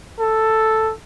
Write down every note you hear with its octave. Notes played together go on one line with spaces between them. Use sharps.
A4